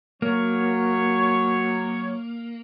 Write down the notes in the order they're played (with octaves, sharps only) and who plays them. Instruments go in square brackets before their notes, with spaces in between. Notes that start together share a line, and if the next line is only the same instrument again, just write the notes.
[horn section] F#3 C#5 [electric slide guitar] A#3